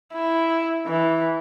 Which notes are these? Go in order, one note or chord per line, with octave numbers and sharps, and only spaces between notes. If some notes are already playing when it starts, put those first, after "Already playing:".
E4
E3